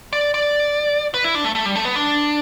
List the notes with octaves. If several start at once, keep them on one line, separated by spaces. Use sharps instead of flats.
D5
D5
B4
E4
D4
A3
A3
G3
A3
B3
D4